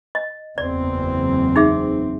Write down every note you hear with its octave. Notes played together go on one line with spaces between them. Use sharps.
D#5
F#1 E2 C4 D5
D#4 G#4 E5